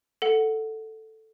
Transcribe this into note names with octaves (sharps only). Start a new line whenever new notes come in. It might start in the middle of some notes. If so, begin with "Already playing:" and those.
A4 F#5